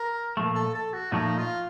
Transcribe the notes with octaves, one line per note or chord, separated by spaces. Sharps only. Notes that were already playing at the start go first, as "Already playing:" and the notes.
Already playing: A#4
A#2 F3 A3
A4
A4
F#4
A#2 F3 A3 D#4
F4